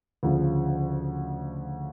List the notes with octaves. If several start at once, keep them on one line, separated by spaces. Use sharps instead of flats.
D2 C#3 F3